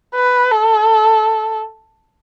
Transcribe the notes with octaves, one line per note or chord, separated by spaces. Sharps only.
B4
A4